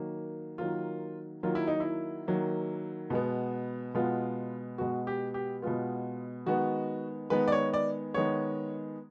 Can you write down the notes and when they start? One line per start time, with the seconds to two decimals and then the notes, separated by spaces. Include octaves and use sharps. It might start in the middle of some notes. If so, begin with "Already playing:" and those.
Already playing: D#3 F#3 A#3
0.58 D#3 F#3 A#3 F4
1.43 D#3 F#3 A#3 F4
1.55 E4
1.67 D#4
1.80 E4
2.27 D#3 F#3 A#3
3.10 B2 G#3 B3
3.95 B2 G#3 B3 F4
4.78 B2 G#3 B3 F#4
5.07 G4
5.34 G4
5.62 B2 G#3 B3 F4
6.46 D#3 G#3 B3 F#4
7.30 D#3 G#3 B3 B4
7.48 D5
7.52 C#5
7.74 D5
8.14 D#3 G#3 B3 C#5